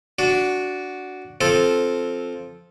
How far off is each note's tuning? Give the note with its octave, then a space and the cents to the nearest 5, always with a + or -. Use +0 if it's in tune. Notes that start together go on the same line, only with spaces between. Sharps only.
D4 -10 F#4 +0
F3 +0 C4 +0 A4 -10